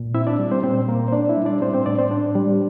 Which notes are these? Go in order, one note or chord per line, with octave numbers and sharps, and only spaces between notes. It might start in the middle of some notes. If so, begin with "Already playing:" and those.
Already playing: A#2
C4 E4 E5
D4 D5
G3
C4 C5
A#2 C4 C5
A#2 A#3 A#4
C5
D4 D5
E4 E5
G3
D4 D5
A2 C4 C5
C4 C5
A2 D4 D5
C4 C5
D4 D5
G3